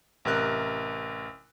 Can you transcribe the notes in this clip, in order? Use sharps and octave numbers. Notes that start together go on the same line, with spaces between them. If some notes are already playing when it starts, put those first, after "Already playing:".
A1 C3 A#4 F#6